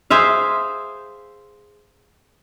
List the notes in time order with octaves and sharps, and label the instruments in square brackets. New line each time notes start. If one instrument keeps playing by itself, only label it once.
[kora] G#4 C5 E5 F5